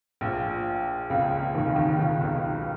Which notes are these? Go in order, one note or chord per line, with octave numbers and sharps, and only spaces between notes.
A#1 A#2
C#2 C#3
D#2 D#3
C#3
D#2 D#3
C#2 C#3
B1 B2